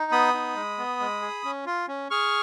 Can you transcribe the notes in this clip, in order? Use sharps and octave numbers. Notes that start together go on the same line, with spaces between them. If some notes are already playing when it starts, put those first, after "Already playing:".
Already playing: D#4
B3 B5 D#6
D#4
G#3
B3
G#3
G#4
C#4
F4
C#4
G#4 C#6 F6